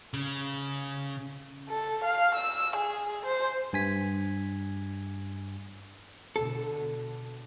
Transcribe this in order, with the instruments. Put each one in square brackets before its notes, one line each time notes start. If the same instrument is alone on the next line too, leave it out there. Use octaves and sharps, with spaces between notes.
[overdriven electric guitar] C#3
[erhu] A4
F5
E6
G#4
C5
[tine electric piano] G2 G#5 B6
[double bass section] B2 D3 [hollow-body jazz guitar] A4